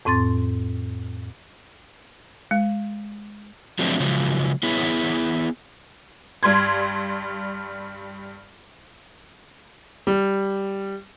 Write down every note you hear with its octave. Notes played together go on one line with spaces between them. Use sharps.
F2 A2 C4 C6 A6
G#3
F3 F#3 G#3 A3 C4 D4
C#3 F3 F#3 G#3
B3 E4 G#4 C#5
G2 G3 C6 G#6
G3